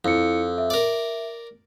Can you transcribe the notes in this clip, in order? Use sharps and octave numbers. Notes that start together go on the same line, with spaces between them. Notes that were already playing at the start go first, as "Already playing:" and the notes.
F2 E4 C#7
E5
A#4 D5